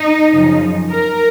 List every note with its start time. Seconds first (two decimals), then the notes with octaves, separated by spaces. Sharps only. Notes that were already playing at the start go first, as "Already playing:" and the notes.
Already playing: D#4
0.31 F#2 C#3 F3
0.90 A#4